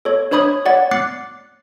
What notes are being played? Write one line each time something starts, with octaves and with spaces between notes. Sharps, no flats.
A4 C#5
D4 C5 C#5 B5 D#6 G#6
C#5 D5 F#5 A6
D6 F#6 A6 C7 C#7